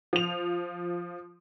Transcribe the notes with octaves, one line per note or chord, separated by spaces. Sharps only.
F3 F7